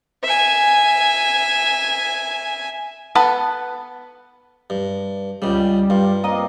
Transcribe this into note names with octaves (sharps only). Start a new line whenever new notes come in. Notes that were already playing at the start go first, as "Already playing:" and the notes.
E5 G#5
B3 A4 B4 F#5 B5
G2
C#2 C#3 G3
G2 F4
A#3 C4 D5 D#5